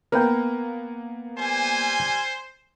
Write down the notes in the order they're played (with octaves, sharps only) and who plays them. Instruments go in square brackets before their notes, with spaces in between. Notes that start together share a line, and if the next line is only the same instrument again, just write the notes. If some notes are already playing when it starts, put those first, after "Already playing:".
[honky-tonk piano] A#3 B3 [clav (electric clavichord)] A#4 B4 G5
[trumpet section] G3 G#5 [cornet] C5